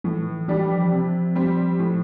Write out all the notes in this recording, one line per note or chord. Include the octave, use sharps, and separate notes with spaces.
A2 E3
E3 G3 D4 G4
F3
C3
G3 C4
A2